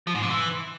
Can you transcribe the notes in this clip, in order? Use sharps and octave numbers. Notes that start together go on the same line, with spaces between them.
F3
G#2
C3
E3